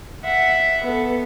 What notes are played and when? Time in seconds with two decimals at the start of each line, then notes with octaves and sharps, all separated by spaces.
0.23 E5 F#5
0.83 B3 A4